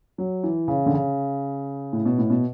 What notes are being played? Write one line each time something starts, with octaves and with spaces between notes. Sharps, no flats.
F#3
E3
C#3
D3
C#3
A2
B2
A2
B2